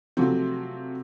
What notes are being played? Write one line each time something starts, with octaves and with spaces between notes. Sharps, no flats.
C3 F3 F#3 A3 C4